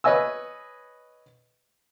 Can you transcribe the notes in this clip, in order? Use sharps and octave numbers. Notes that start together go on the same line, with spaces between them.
B4 C#5 D#5 G#5 E6